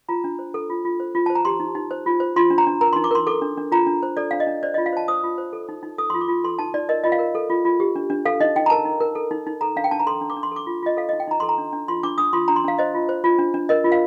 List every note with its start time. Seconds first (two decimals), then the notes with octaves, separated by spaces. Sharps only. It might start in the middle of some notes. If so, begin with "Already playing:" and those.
0.09 F4 A#5
0.24 D4
0.39 C5
0.54 A4
0.70 F4
0.85 F4
1.00 C5
1.15 F4
1.26 C5 A5
1.35 A#5
1.45 G4 C6
1.60 D#4
1.75 D#4
1.91 C5
2.06 F4
2.20 C5
2.36 F4 C6
2.50 D4
2.58 A#5
2.67 D4
2.81 A#4 A#5
2.93 D#4 C6
3.04 D6
3.11 A#4 C6
3.27 A4 D6
3.42 D4
3.57 D4
3.72 F4 A#5
3.87 D4
4.03 C5
4.17 A4 D5
4.31 D4 F5
4.40 D#5
4.47 D4
4.63 C5 D5
4.74 F4 D#5
4.86 F5
4.93 C5 A5
5.08 C5 D#6
5.23 F4
5.38 C5
5.53 A4
5.69 D#4
5.83 D#4
5.98 A4 D#6
6.10 F4 C6
6.21 D6
6.28 F4
6.44 A4 C6
6.59 D#4 A5
6.74 D#4 D5
6.89 A#4 D#5
7.04 F4 D#5
7.12 F5
7.19 A#4
7.35 A4
7.50 F4
7.65 F4
7.80 G4
7.96 D4
8.10 D4
8.25 A4 F5
8.40 D#4 D#5
8.56 D#4 G5
8.66 A#5
8.70 A#4 A5
8.85 D#4
9.00 A#4
9.15 A4
9.31 D#4
9.47 D#4
9.61 A4 A#5
9.76 D4 F5
9.84 G5
9.91 D4 A5
10.00 A#5
10.07 A4 C6
10.21 D4
10.30 D6
10.37 D4
10.43 C6
10.51 A4 D6
10.67 F4
10.83 F4 D#5
10.97 A4 F5
11.09 D#4 D#5
11.20 G5
11.28 D#4 A#5
11.40 A4 C6
11.49 A#5
11.58 D4
11.73 D4
11.88 F4 C6
12.03 D4 D6
12.18 D4 D#6
12.33 F4 C6
12.48 D4 A#5
12.56 C6
12.64 D4 F5
12.78 C5 D#5
12.94 F4
13.09 C5
13.24 F4
13.38 D4
13.54 D4
13.69 A#4 D#5
13.84 F4
13.92 F5